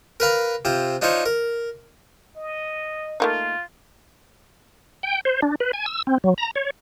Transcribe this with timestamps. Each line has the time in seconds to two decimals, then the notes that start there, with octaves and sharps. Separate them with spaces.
0.20 A#4 B4 F5 A#5
0.65 C3 F4 C5
1.02 D4 D#4 F4 C5 C#5
1.26 A#4
2.37 D#5
3.20 A3 A#3 D#4 F4
5.03 G5
5.25 C5
5.42 D4
5.60 B4
5.73 G#5
5.86 E6
6.07 C4
6.24 F#3
6.38 A#5
6.56 C#5